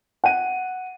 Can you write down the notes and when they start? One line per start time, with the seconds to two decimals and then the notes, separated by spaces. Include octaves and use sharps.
0.24 F#5 D#7